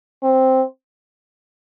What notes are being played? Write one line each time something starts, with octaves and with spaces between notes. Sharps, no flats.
C4